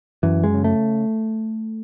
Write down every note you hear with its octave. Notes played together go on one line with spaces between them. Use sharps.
F#2 E3
G#3
C#3
A3